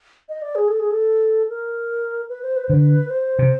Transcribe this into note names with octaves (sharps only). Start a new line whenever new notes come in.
D#5
D5
G#4
A4
G#4
A4
A#4
B4
C5
B4
C5
D3 B4
C5
C3